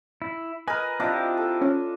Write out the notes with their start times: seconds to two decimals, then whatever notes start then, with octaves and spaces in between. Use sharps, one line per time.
0.22 E4
0.68 A#4 B4 D#5 G#5
1.00 C4 D4 E4 F4 G4 D#5
1.37 A4
1.61 C#4